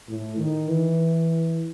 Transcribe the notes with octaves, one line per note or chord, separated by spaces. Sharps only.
A2
D#3
E3